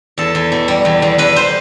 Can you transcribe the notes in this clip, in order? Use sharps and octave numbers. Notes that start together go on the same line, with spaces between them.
E2 A4
E2
B2
G3
E2
E2
E2 B4
C5